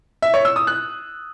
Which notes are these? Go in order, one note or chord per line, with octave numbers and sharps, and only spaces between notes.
E5
C#5
E6
D#6
F#6